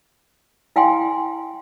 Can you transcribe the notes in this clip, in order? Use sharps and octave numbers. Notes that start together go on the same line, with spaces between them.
E4 F5 G5 G#5 C6